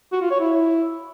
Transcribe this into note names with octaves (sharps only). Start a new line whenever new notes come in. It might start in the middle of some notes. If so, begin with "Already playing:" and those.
F#4
F4
C#5
E4